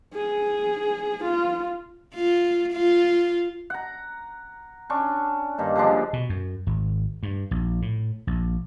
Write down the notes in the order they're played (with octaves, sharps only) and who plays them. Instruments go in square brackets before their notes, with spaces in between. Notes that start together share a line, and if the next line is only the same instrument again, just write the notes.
[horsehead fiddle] G#4
F4
[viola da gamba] F4
F4
[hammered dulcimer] F#5 A#5
C#4 D4 C#6
G2 D#3 A#3
D3 F3 G#3 D4
[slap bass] B2
F#2
G#1
G2
A#1
A2
A#1